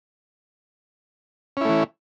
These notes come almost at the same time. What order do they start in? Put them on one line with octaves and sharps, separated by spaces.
C#4 E4 A3 E3